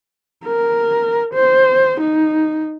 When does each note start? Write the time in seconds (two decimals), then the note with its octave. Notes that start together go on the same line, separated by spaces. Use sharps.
0.44 A#4
1.34 C5
2.00 D#4